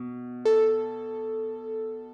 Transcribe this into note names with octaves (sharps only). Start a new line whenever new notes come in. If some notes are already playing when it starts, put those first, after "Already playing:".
Already playing: B2
A4